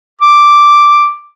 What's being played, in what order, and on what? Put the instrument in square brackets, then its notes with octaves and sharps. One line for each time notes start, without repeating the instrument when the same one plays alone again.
[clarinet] D6